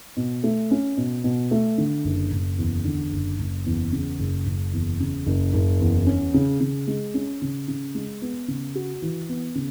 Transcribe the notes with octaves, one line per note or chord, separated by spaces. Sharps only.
B2
A3
C#4
B2
B2
A3
D3
F#1
F#1
E2
D3
F#1
F#1
E2
C#3
F#1
F#1
E2
C#3
F#1
F#1
E2
C#4
C#3
C#3
G#3
C#4
C#3
C#3
G#3
B3
C#3
F#4
E3
B3
C#3